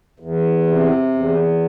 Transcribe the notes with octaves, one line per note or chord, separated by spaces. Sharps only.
E2
C3
E2